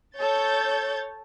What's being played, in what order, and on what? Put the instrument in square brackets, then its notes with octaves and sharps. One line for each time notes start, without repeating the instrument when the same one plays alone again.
[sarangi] A4 [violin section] C#5 G6 A6